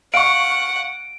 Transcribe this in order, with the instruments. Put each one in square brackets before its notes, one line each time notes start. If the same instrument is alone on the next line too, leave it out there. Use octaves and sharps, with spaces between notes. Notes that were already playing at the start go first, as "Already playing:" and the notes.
[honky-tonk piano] F5 C#6 [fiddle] F#5 [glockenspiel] D7